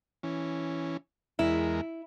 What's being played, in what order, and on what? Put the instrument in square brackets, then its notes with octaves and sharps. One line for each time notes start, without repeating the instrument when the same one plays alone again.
[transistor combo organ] E3 C#4
[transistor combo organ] E2 G#3 A#4 [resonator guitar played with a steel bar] E4